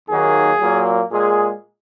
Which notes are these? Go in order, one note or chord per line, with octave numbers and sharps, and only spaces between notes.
D#2 D#3 F#3 A#3 G#4
A#2 F#3 A#3
A#2 G#3 G#4